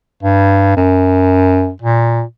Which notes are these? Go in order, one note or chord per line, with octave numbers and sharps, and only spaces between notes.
G2
F#2
A#2